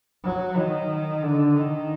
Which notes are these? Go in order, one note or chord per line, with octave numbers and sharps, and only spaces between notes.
F#3
D#3
D3
D#3